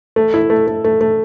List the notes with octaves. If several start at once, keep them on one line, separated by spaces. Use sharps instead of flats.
A3
E4
A3
A3
A3
A3